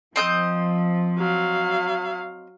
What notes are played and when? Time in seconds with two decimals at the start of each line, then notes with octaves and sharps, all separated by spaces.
0.16 F3 C4 D#5 G6
1.18 F#3 F5